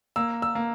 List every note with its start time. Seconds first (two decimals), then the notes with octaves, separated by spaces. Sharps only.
0.16 A#3 E6
0.42 E6
0.55 A#3